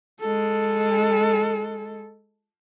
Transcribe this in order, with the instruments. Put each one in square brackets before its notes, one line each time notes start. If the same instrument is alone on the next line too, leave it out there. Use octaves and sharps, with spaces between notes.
[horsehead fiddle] G#3 A4